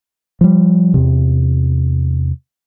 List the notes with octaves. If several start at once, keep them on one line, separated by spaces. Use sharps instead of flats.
F3 G3
E2 C3